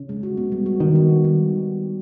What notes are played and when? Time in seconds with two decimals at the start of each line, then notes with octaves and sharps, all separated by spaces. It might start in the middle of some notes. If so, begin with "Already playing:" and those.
Already playing: C#3
0.09 G#3
0.23 F#4
0.37 B3
0.52 G3
0.66 F#4
0.80 D#3 B3
0.95 F#4
1.09 B3
1.24 G3